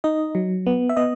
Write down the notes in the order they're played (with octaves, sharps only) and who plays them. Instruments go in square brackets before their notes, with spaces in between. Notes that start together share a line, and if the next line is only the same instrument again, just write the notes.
[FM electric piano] D#4 D#5
F#3
B3
E5
B3 D#5